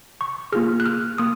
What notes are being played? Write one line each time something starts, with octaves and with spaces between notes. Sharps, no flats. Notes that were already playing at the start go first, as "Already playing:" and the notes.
C#6
A#3 F4 G#4 F6
F#6
F6
A#3 D#6